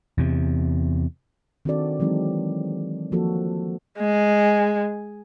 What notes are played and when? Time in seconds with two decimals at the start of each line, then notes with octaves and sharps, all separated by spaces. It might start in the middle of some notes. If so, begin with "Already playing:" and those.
0.18 E2 C3
1.65 D#3 C4 D4 F#4 A4 D5
2.00 E3 F#3 G#3 C4 D#4
3.12 F3 A#3 F#4 A4
3.99 G#3